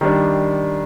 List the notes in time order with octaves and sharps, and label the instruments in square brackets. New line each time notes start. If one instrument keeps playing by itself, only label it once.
[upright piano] D#3 G3 D4